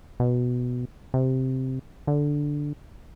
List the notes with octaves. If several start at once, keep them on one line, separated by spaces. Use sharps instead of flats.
B2
C3
D3